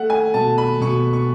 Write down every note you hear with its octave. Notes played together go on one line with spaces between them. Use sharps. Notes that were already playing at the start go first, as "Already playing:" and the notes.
Already playing: A3 F#5
G#5
B2 A5
B5
B2 C#6
C#6